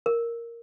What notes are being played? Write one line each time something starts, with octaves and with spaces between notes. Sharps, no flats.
A#4